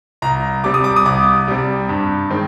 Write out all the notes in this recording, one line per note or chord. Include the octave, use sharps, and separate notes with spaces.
C2 A#5
C3 G3 D6
D#6
D6
D#6
C2 D6
C3 G3
G2
D#3 G#3 C4